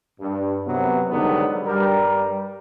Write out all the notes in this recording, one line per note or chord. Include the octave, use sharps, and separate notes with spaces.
G2
F#2 C3 F#3 B3
G#2 D3 D#3 F#3 G3 B3
G2 G3 A#4